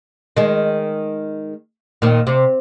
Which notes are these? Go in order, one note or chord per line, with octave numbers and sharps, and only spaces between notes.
D#3 G#3
A#2 D#3
C3